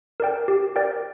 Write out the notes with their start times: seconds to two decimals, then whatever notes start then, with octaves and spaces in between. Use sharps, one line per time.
0.20 A#4 D5 G5
0.48 G4
0.76 A#4 D5 G5